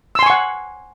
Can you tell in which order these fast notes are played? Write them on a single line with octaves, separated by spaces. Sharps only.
E6 C6 G#5 C#6 F#5